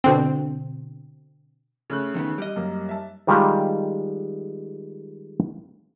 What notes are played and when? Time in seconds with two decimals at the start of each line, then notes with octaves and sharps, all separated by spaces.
0.04 B2 D3 C4
1.90 C#3 A3 F#6
2.14 E2 D#3 B3
2.38 G3 D#5
2.56 F#2 A#3
2.89 E5 A5
3.27 D#3 G3 G#3 F4 G4 F5